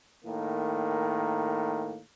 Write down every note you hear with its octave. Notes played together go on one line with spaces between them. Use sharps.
A2 D#3 A#3